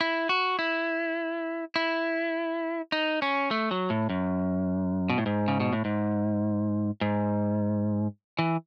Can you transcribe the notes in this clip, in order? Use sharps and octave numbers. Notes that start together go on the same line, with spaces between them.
E4
F#4
E4
E4
D#4
C#4
A3
F#3
A2
F#2
B2
A2
G#2
C#3
B2
A2
G#2
G#2
E3